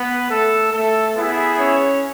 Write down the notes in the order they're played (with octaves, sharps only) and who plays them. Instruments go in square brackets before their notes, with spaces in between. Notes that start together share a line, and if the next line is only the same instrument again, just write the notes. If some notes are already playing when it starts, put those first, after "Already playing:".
Already playing: [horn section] B3 B4
A3 A4
A3 A4
[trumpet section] B3 E4 G#4
[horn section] C#4 C#5